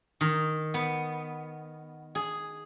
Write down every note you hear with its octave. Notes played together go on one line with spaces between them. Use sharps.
D#3
B3
G#4